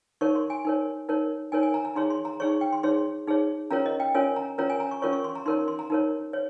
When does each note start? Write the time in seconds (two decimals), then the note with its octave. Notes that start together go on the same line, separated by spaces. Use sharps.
0.21 D#4 A#4 C#5 C#6
0.35 C6
0.50 G#5
0.65 D#4 A#4 C#5
1.09 D#4 A#4 C#5
1.52 D#4 A#4 C#5 G#5
1.63 G#5
1.74 A#5
1.85 A#5
1.96 D#4 G#4 C#5 C6
2.10 C6
2.25 A#5
2.40 D#4 G#4 C#5 C#6
2.61 G5
2.73 C6
2.83 D#4 G#4 C#5 C6
3.27 D#4 G#4 C#5
3.71 C#4 F4 A#4 C#5 A#5
3.86 D#5
4.00 G5
4.14 C#4 F4 A#4 C#5 G#5
4.36 A#5
4.58 C#4 F4 A#4 C#5 A#5
4.70 G#5
4.80 A#5
4.91 C#6
5.02 C#4 F4 A#4 C#5 C#6
5.13 C#6
5.24 C6
5.35 A#5
5.46 D#4 A#4 C#5 C6
5.68 C6
5.79 A#5
5.90 D#4 A#4 C#5
6.33 C#5